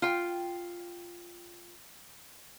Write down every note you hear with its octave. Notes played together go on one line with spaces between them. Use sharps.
F4 G5